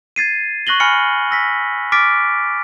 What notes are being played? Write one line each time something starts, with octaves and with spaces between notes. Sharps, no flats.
G#6 A6 C7 D#7
C#6 F#6 A#6 F#7 G7
G#5 B5 F6 C#7
E6 A#6 B6
D6 F6 A6 B6 D7